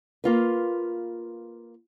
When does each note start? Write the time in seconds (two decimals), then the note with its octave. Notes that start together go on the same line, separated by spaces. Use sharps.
0.24 A#3 F4 B4